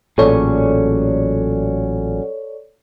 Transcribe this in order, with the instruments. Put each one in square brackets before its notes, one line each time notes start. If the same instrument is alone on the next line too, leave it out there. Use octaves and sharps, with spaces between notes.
[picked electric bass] A1 A#2 [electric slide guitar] F#3 C#4 G#4 [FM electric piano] A4 C#5 D5